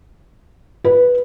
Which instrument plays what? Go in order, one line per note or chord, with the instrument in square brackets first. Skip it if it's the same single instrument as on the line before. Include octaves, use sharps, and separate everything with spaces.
[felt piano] B4